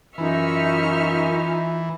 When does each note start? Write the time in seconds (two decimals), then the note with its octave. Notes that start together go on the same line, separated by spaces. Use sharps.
0.18 F#2 E3 D#4 F4 E5 G#5 C#6 F6